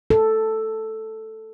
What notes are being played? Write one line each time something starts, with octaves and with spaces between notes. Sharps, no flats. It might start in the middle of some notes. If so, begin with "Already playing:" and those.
A4